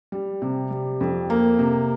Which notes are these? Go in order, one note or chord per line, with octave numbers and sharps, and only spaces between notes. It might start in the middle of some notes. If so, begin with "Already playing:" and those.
G3
C3
G3
F2
A#3
C3